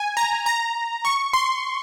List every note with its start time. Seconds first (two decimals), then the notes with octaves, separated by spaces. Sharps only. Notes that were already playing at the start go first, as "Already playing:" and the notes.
Already playing: G#5
0.17 A#5
0.46 A#5
1.05 C#6
1.33 C6